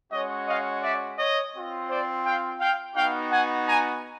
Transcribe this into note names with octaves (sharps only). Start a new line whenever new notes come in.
G#3 C#4 F#4 C#5 D#5
D#5 F5
D5 E5
C#5 D#5
C4 F4
C5 D5
F5 G5
F5 G5
B3 D#4 F#4 F5 G5
F#5 G#5
G#5 A#5